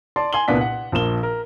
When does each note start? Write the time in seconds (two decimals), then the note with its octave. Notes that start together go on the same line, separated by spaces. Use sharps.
0.16 D5 A5 C6
0.33 G#5 C6 F#7 G7
0.48 C2 A#2 B3 D4 B6
0.61 F#5
0.92 A#1 F3 A#3 E7 G7
1.23 A#4